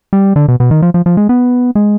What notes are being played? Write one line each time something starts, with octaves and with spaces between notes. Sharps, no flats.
G3
D3
B2
B2
D#3
F3
F3
F3
G#3
B3
G#3